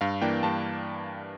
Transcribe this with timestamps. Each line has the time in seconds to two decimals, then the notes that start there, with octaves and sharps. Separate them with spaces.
0.01 G2 F5
0.21 E3 A#3 D4 G5
0.43 G2 A5